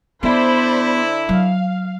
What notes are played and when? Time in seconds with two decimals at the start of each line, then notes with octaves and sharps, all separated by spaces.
0.23 D3 B3 E4 C5 D5 B5
1.29 F#3 F5